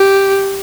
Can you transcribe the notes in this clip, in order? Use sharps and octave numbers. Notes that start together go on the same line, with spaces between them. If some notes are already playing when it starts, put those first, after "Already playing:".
Already playing: G4